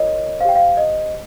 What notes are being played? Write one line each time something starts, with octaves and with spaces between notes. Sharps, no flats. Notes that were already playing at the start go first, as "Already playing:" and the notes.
Already playing: F4 A#4 C#5 D#5
G4 C5 F5 G5
F5
D#5